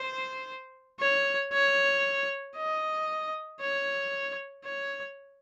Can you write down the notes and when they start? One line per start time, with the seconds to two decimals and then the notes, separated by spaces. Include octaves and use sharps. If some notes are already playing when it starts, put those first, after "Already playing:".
Already playing: C5
1.00 C#5
1.53 C#5
2.57 D#5
3.61 C#5
4.65 C#5